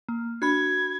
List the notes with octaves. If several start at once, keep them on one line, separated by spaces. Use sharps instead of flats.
A#3
D4 F#4 B5 G#6